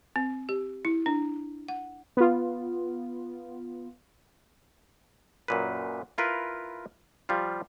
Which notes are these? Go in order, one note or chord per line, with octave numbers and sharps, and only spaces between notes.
C4
G4
E4
D4
F#5
B3 F4
F#2 A#2 B4
E4 F4 A#4 B4
F3 G3 F4